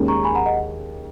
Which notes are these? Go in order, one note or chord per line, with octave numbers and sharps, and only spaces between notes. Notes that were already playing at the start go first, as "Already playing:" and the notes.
Already playing: D#2 D#3 G#3 C#4
A#5 C#6
G#5 B5
F#5 A#5
D#5 F#5